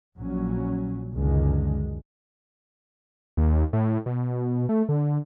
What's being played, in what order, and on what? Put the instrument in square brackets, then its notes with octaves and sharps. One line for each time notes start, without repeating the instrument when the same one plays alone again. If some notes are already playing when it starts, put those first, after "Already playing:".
[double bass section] A#1 F#3 C#4
C#2 F#2 D3 D#3 G#3
[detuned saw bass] D#2
A2
B2
A3
D3